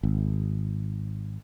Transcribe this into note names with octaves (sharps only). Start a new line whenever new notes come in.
G#1